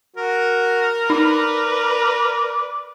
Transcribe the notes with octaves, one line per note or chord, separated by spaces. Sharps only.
F#4 A#4
D#4 B4 D5